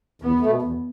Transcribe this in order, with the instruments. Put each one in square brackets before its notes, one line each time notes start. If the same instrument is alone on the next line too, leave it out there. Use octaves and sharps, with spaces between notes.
[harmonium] E2 [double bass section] B3
[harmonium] B2 A3
E2